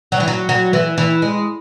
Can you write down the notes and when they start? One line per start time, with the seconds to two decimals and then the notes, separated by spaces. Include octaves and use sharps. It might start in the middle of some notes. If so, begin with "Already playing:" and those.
0.12 F#3
0.20 E3
0.28 F#3
0.49 F#3
0.73 E3
0.98 E3
1.22 G#3